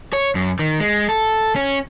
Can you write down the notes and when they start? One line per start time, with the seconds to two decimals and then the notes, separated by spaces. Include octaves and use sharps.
0.13 C#5
0.35 F#2
0.59 D#3
0.80 G#3
1.09 A4
1.56 C#4